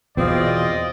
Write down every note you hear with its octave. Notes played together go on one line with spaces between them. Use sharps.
E2 B2 C4 F4 D5 D#5